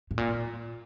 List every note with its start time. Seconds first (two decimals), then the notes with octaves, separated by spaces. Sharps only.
0.11 A2
0.18 A#2